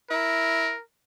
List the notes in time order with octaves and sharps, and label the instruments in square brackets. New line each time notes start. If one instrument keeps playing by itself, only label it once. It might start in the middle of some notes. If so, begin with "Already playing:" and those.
[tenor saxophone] E4 [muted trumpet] A#4